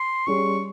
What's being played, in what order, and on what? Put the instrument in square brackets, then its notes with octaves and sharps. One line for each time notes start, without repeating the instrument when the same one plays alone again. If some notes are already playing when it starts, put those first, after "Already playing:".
Already playing: [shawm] C6
[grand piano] G3 C#4 G#4 [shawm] C#6